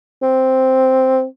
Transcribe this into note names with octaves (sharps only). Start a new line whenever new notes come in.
C4